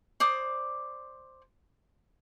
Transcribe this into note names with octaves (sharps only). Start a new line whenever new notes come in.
C5 D5 D6 D#6